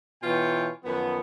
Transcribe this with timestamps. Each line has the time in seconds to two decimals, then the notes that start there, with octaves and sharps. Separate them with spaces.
0.23 B2 E3 B3 F4 C#5 G5
0.84 F#2 D#3 F3 B3